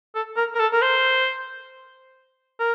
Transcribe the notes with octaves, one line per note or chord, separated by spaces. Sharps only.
A4
A#4
A#4
A4
A#4
C5
A#4